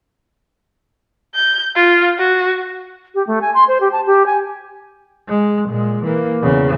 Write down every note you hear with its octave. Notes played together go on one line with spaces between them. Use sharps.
G6
F4
F#4
G4
A3
G#5
C6
C5
G4
A5
G4
G#5
G#3
A#2 G#3
E3 A#3
E2 C#3